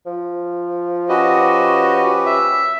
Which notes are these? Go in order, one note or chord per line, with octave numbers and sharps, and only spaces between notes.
F3
C#4 F#4 G4 B4 D#5
E5